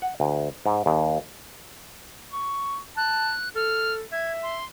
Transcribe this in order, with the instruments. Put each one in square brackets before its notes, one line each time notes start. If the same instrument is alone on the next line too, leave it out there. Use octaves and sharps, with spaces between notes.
[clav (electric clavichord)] F#5
D2
G#2
D#2
[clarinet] C#6
[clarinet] A5 [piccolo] F#6
[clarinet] A4 [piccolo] F6
[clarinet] E5 [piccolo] G#6
[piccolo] C6